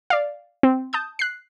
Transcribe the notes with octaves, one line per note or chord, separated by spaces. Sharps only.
D5 F5
C4
A5 D#6 G6
F#6 C7